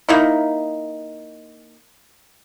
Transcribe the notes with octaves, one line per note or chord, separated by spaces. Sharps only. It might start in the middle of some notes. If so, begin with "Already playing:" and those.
A#3 D#4 E4